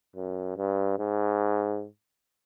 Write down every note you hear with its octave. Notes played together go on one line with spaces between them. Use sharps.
F#2
G2
G#2